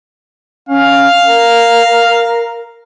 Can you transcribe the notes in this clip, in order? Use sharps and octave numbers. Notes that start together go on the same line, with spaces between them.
C#4 F5
A#4